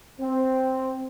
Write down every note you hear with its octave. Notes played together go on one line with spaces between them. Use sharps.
C4